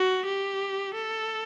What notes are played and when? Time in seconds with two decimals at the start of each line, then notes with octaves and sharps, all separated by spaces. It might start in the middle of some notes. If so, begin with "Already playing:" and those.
Already playing: F#4
0.25 G4
0.94 A4